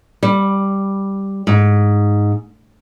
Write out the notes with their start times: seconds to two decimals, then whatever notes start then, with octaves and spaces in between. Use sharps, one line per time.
0.23 G3
1.47 G#2